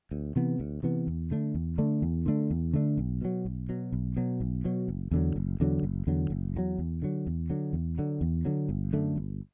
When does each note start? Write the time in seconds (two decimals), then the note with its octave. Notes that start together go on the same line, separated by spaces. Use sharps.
0.11 D2
0.36 C3 E3 B3
0.60 D2
0.83 C3 E3 B3
1.07 E2
1.31 D3 A3 D4
1.55 E2
1.78 D3 A3 D4
2.02 E2
2.26 D3 A3 D4
2.50 E2
2.74 D3 A3 D4
2.98 B1
3.21 B2 F#3
3.45 B1
3.69 B2 F#3
3.92 B1
4.17 B2 F#3
4.40 B1
4.64 B2 F#3
4.88 F#1
5.11 E2 D3 F#3
5.36 F#1
5.60 E2 D3 F#3
5.83 F#1
6.07 E2 D3 F#3
6.30 F#1
6.55 E2 D3 F#3
6.78 E2
7.02 D3 F#3
7.27 E2
7.50 D3 F#3
7.73 E2
7.98 D3 F#3
8.21 E2
8.45 D3 F#3
8.69 G1
8.93 F#2 D3 A3
9.16 G1